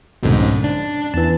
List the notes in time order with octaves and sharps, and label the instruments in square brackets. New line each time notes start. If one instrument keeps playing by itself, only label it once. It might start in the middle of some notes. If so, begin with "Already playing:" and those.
[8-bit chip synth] C2 F2 G#2 [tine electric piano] B2 D3
[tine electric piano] C#4
[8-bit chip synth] D4
[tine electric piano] E2 E3 [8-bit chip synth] A5